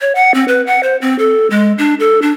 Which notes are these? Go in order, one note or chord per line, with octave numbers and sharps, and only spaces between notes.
C#5
F#5
C4
B4
F#5
C5
C4
A4
G#3
D4
A4
D4